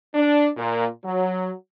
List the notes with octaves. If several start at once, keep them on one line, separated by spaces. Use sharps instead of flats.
D4
A#2
F#3